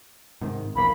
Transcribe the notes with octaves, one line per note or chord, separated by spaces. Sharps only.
G#2 C3 D#3
E1 A#1 A#3 B5